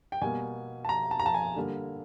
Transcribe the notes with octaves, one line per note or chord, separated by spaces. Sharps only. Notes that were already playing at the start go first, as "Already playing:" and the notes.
G5
B2 G3 A#3 G#5
A5
A#5
A5
A#5
A5
G#5
D3 G3 A#3